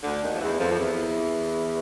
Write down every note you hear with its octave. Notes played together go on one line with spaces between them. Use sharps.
D2 D3
D#2 D#3
F3
E2 E3
F2 F3
F3
E2 E3